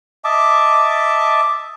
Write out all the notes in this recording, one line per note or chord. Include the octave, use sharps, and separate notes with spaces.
D#5 E5 A5 D6